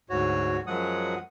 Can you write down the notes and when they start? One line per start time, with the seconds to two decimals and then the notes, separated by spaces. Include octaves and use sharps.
0.10 D2 G#2 F#4 C#5
0.67 F#2 F3 F#3 G#3 F#5 D#6